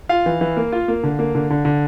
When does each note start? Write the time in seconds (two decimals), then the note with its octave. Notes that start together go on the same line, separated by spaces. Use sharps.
0.09 F4 F5
0.26 E3
0.41 E3
0.57 A#3
0.72 F4
0.88 A#3
1.03 D3
1.19 A#3
1.35 D3
1.50 D3
1.65 D3